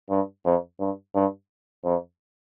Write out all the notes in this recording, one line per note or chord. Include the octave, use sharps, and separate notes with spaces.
G2
F2
G2
G2
F2